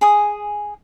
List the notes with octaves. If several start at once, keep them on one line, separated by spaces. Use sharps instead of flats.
G#4 G#5 D#6